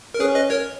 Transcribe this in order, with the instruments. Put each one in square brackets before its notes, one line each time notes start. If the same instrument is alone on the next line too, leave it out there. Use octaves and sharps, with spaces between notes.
[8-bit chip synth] A#4
[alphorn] C#4 [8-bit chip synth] G#4 B4
[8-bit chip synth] B4 D#5
A#4 C#5